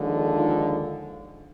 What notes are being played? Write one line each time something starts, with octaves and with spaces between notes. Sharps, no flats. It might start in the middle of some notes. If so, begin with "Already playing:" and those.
Already playing: D#2 D3 F3 G#3
D#4 F4